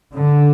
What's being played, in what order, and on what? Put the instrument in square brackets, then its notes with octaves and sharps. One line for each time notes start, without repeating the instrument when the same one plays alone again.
[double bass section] D3